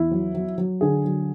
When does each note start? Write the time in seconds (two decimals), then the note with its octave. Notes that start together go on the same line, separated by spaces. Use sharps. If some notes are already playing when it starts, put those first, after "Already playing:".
Already playing: E2 E4
0.11 F#3
0.34 F#3
0.58 F#3
0.81 D3 G#4
1.05 F#3